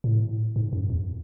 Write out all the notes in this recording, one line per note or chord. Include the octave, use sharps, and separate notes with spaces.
A2
G#2
F#2
E2